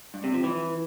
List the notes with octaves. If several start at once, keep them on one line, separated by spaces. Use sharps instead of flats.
G2
C3
F3
E3